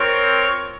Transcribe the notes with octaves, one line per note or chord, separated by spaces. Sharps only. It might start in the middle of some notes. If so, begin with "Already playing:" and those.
Already playing: C4 F4 A#4 C#5